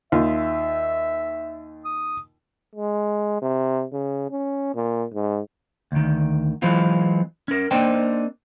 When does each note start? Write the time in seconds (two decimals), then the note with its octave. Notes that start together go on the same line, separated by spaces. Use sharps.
0.12 D#2 F4 E5
1.85 D#6
2.75 G#3
3.42 C3
3.93 C#3
4.30 C#4
4.75 A#2
5.14 G#2
5.92 D2 D#3
6.62 E3 F#3 G#3 C4 F4
7.48 C#4 A#4
7.71 A#3 C4 D4 D#4 C5 G5